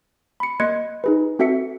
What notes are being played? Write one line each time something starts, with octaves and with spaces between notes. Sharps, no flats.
B5 C#7
A#3 D#5 C6 F#6 G#6 C#7
D#4 G#4 B4
C4 F#4 A4 E5 B6 C#7